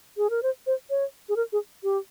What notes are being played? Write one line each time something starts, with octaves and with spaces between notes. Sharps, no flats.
G#4
A#4
C5
C5
C#5
G#4
A#4
G#4
G4